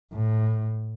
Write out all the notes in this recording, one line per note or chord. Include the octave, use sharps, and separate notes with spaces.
A2